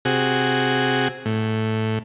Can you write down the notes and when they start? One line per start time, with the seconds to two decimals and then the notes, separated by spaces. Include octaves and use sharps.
0.05 C3 F#4 G#4
1.26 A2